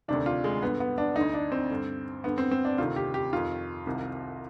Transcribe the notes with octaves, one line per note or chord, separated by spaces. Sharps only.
D2 C3 D#3 D4
F4
G#3
G2 D3 B3
B3
D4
D2 D3 D#4
D4
C4
G2 D3
G2 D3 B3
C4
C4
D4
D2 C3 D#3 F4
G4
G4
F2 D#3 F4
C2 C3 D#3